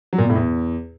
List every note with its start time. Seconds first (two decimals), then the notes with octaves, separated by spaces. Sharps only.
0.13 F#3
0.18 A#2
0.24 B2
0.30 A2
0.35 E2